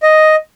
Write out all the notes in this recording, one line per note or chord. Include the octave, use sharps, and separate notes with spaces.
D#5